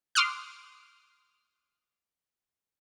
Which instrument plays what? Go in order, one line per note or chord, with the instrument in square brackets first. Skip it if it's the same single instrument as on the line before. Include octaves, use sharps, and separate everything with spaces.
[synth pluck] C6 D6 D#6 F6 F#6